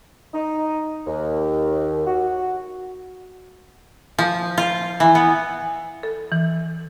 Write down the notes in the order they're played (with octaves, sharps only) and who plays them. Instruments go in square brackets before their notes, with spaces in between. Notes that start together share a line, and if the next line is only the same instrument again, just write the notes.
[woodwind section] D#4
D#2
F#4
[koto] F3
F4
E3
B3
[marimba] A4
E3